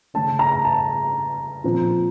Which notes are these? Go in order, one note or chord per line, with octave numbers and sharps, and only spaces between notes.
C#3 A3 C#4 A5
A#5
A5
A#2 F3 C4